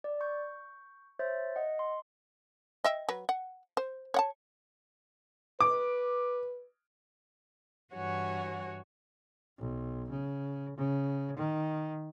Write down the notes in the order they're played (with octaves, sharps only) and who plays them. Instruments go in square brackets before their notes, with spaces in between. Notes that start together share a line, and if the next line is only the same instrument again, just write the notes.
[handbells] D5
C#6 G6
C5 C#5 E5 A6
D#5 F#5
C6
[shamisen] D#5 E5 G5
F#3 B4
F#5
C5
C#5 F#5 A5
[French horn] B4 [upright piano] D6
[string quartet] G2 E3 F#4 C#5 F#5 G#5
[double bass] B1
C#3
C#3
D#3